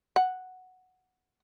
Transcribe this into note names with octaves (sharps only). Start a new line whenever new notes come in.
F#5